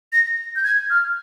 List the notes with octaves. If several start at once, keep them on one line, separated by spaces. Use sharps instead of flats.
A#6
G6
G#6
F6